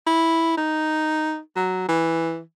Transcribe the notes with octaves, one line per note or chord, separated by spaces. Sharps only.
E4
D#4
F#3
E3